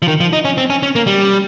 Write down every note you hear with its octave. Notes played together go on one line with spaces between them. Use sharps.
F3
D#3
F3
D#4
C#4
C4
C#4
C#4
A#3
G3